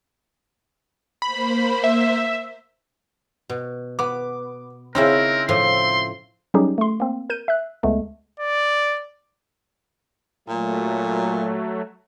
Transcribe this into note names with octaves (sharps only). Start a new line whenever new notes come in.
A#3 C5 B5
E5
B2
B3 D6
C#3 C4 C#4 D#4 E4 A#4
A2 F3 C6
F#3 G3 C#4 D#4 G4 G#4
A3 C6
A#3 C4
A#4 G6 D#7
E5 F#6
C#2 G#3 A3 B3
D5
A#2 F#3 A3